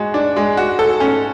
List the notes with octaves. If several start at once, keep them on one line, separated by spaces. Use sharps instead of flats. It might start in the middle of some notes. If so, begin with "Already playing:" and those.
Already playing: G#3 F#4
D4
G#3
F#4
A4
C#4